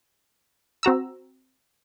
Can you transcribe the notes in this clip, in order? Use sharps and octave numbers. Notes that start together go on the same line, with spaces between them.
C4 F#4 A#5 E6